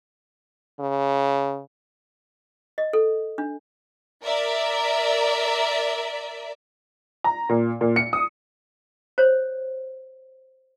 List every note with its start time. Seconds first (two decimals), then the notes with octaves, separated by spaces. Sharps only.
0.80 C#3
2.78 D#5
2.93 A4
3.38 D4
4.24 A#4 D5 E5
7.24 A#5
7.49 A#2
7.81 A#2
7.96 C#7
8.13 D#6
9.18 C5 C#5